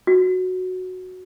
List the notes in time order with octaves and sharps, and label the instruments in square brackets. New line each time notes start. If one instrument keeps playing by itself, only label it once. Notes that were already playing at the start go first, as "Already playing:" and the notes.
[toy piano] F#4